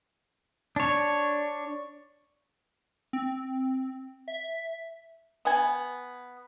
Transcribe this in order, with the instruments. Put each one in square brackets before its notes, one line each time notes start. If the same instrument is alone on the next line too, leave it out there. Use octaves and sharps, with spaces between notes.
[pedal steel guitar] D4 C#5
[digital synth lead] C4
E5
[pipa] B3 G#5